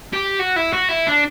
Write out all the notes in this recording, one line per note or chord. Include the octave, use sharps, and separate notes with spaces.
G4
F#4
E4
F#4
E4
D4